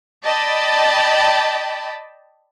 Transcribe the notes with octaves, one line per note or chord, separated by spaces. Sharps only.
D5 D#5 G5 A5 B5